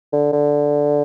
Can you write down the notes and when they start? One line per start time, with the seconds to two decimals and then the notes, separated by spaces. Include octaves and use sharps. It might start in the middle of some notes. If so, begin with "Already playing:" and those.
0.13 D3
0.33 D3